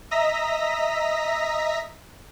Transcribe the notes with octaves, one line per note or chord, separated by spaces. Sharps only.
D#5 E5 A#5 A#6 B6